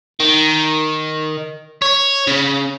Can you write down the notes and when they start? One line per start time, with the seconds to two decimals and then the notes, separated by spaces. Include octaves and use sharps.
0.20 D#3
1.82 C#5
2.27 C#3